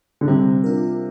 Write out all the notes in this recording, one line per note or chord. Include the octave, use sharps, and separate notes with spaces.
D3
C3 G3
D4 F4 A#4